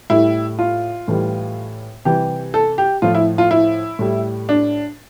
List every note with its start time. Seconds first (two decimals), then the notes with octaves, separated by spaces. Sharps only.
0.10 A2 G3 E4
0.59 F4
1.08 A2 E3 G3
2.05 C3 E3 G3 G4
2.54 A4
2.78 G4
3.02 A2 F3 F4
3.15 E4
3.38 F4
3.51 E4
3.99 A2 G3
4.49 D4